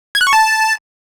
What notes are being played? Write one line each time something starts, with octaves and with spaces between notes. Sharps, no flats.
G#6
F#6
C#6
A5